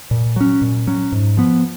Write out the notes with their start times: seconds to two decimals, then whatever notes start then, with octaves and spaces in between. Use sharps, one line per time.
0.11 A#2
0.36 F#3 C#4
0.62 A#2
0.87 F#3 C#4
1.12 G#2
1.37 F3 B3